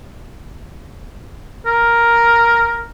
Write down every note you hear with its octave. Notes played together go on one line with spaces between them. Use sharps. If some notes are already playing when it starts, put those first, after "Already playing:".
A#4